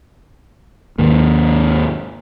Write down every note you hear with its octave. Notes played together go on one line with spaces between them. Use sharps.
D#2 G#2 D#3 A#3